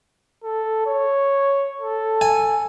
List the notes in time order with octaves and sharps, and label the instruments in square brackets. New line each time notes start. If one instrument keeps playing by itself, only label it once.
[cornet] A4
C#5
A4
[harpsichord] G#5